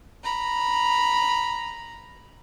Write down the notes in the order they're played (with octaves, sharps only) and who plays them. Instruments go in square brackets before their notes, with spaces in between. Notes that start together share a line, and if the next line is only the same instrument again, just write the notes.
[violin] A#5 B5